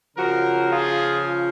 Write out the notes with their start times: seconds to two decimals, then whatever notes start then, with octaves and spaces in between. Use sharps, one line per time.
0.17 C#3 F3 F#4 A#4
0.72 F4 G#4